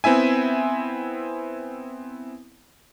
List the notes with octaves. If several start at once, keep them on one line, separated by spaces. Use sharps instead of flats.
B3 C4 E4 E5 G#5